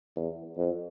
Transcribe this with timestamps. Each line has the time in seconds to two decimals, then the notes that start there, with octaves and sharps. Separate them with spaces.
0.16 E2
0.57 F2